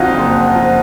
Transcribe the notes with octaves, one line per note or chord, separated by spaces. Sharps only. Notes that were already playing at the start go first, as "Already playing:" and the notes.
Already playing: F2 D3 D#4 F4 F#4
F#1
F3